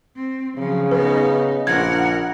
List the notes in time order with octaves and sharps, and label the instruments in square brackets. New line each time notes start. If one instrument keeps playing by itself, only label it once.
[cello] C4
[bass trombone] C#3 [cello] F3 F#3
[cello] B3 D#4 [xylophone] B4
[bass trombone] A#1 [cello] A#4 F#5 [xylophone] G#6